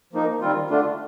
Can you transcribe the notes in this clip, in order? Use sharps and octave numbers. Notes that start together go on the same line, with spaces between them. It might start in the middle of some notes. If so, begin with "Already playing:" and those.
F3 A#3 D#4
D#3 G3 C4 F4
D3 A3 D4 F4